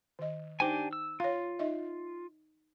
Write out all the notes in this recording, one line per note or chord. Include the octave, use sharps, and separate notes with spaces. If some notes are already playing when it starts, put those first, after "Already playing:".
D#3 D#5
D4 D#4 G4 C5 G5 G#5
E6
F4 C#5 F5
D#4 D#5 E5